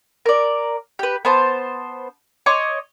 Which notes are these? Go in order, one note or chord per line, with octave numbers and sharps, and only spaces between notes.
A#4 D5
G4 B4
B3 C5 A5
C#5 D#5 C6 D6